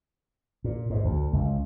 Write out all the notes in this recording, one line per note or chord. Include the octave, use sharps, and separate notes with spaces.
A#2
G#2
D2
C#2